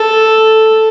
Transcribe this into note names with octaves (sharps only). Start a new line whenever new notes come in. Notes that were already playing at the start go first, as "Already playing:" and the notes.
Already playing: A4